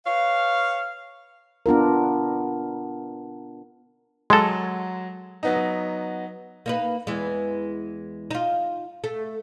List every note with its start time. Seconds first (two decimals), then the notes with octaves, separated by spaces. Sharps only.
0.07 B4 C#5 F5
1.66 B3 D4 F4 A#4
4.30 F#3 G#3 A4
5.43 F#3 B3 D#4
6.66 A#3 D#4 B4
7.07 E2 E3 G#3
8.31 D#4 F4
9.04 A3